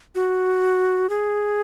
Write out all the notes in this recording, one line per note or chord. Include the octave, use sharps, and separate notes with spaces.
F#4
G#4